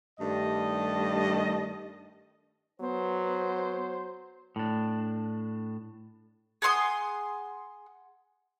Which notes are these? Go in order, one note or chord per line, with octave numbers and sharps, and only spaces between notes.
G2 D#3 G3 A3 D#5 A5
F#3 B3 C5
A2 D4
G#4 F#5 C6 D#6